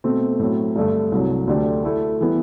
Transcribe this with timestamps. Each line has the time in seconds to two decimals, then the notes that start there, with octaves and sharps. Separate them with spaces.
0.04 B2 A3 C4
0.39 A2 F#3 C4
0.76 G2 D3 A3
1.12 C2 C3 F#3
1.47 D2 D3 A3 D4 G4
1.83 D3 A3 E4 A4
2.20 E3 G3 B3 E4